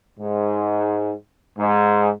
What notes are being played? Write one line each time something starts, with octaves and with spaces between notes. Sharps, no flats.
G#2
G#2